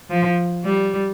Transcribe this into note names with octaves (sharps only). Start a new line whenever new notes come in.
F3
G3